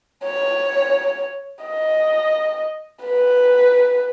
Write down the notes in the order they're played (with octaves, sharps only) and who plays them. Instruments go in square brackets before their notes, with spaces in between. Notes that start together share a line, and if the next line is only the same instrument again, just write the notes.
[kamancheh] C#5
D#5
B4